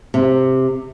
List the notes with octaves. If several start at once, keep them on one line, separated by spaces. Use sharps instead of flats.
C3